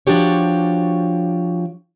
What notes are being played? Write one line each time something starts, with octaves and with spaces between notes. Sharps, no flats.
F3 D4 F#4 G4 C#5